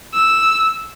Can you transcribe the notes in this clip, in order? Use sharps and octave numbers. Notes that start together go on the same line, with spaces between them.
E6